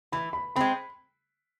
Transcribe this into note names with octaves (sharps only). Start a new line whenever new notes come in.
E3 B5
B5
G#3 C4 B5